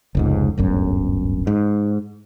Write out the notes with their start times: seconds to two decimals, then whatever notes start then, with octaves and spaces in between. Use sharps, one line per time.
0.15 F1 C#2 G#2
0.57 D1 G1 F#2
1.47 G#2